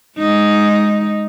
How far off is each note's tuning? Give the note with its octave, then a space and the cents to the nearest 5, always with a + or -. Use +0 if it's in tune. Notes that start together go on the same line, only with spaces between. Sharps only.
G#3 +0 D#4 +0